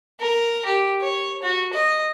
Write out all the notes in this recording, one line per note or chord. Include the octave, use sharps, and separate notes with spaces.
A#4
G4
C#5
F#4
D#5